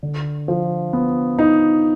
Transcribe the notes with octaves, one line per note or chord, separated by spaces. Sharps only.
D3
F3
B3
D#4